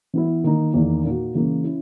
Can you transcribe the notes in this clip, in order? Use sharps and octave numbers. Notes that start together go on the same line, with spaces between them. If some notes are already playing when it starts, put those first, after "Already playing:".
E3 B3 E4
D#3 A#3 D#4
E2 D#3 A#3 D#4
A#2 A#3 D#4 F#4
C#3 E3 A#3
C#4 E4